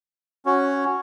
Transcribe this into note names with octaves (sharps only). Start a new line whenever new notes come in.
C#4 F#4 C#5